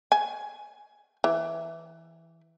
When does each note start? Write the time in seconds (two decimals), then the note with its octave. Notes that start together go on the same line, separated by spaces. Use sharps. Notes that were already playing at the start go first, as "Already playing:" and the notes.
0.12 G#5
1.24 E3